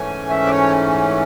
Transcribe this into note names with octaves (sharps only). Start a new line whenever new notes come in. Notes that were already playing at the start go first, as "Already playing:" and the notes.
Already playing: G#2 E3 A3 C#4 G#5
E5
D5
C#5